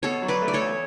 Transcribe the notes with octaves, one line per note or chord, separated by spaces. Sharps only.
B2 A4 C#5
F#3
B4 D5
A3
D5
A4 C#5
E2